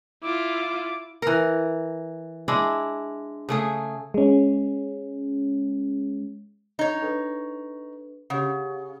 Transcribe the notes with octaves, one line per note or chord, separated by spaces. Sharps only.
E4 F4 D6
E3 A#4
G#3 D4 E4
C#3 A3 G#4
G#3 C#4
D#4 C#5
D4 A4 B4
C#3 G4 C#5 F#5